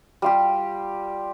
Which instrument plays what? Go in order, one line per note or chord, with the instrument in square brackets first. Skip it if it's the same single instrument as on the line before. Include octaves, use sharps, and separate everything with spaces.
[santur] G3 F4 G4